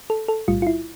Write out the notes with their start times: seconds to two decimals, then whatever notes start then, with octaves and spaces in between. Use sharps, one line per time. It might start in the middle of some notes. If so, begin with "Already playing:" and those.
0.10 A4
0.28 A4
0.48 B1 A2 G3 F4
0.62 F4
0.67 E4